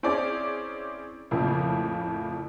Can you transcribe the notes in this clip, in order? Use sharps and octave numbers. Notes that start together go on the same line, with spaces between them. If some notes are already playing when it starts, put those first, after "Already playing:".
C4 C#4 E4 G#4 D5
F2 A2 C#3 F3 A#3 E4